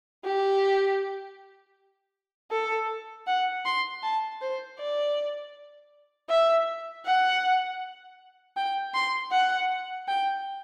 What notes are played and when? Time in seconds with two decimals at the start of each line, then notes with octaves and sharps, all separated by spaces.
0.25 G4
2.51 A4
3.27 F#5
3.65 C6
4.03 A5
4.41 C5
4.79 D5
6.30 E5
7.06 F#5
8.57 G5
8.94 C6
9.32 F#5
10.08 G5